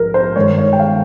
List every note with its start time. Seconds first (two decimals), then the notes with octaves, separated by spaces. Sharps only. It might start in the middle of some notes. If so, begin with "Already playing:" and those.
Already playing: A#1 G#2 F3 A#4
0.14 C5
0.36 G2 D#3 G#3 C#5
0.58 C#5
0.73 G5
0.80 F5